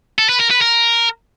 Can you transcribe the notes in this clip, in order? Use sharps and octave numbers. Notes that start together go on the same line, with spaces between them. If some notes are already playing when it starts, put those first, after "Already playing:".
A4
B4
A#4
B4
A#4